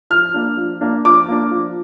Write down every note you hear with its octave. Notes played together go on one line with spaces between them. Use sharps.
F3 F6
A#3 D4
F3
A#3 D4
F3 D6
A#3 D4
F3